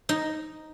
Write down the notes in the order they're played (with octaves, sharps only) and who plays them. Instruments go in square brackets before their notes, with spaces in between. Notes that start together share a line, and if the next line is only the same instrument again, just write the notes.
[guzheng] D#4